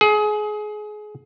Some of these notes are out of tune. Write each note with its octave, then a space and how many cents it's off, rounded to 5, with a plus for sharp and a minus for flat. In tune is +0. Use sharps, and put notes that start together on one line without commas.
G#4 +25